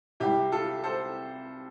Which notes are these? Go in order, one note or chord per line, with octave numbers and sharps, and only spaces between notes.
C2 C3 G3 E4 G4
F4 A4
A4 C5